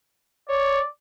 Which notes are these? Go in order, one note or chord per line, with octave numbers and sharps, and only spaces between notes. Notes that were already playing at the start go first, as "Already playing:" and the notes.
C#5 D5